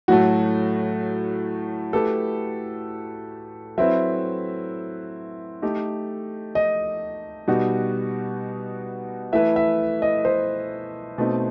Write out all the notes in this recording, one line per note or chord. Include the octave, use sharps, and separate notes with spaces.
A2 F#3 A3 F#4
A3 E4 G4 A4 B4
F#3 C4 E4 B4 E5
A3 D#4 G4
D#5
B2 G3 D#4 F#4
E3 A3 E4 B4 E5
E5
D#5
C5
B2 A3 C4 D#4